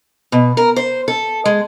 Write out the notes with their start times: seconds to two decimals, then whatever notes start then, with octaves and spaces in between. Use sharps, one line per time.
0.32 B2
0.57 A#4
0.76 C5
1.08 A4
1.45 G#3